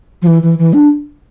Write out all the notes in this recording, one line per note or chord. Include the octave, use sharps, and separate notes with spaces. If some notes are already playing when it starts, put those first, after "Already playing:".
F3
E3
E3
E3
D4